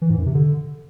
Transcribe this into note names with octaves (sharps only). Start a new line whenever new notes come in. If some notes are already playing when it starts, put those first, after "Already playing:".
E3
G#2
F#2
C3
D3